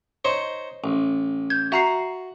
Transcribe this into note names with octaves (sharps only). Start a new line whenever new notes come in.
D#4 C5 C#5
A1
G6 G#6
F#4 E5 A#5 C7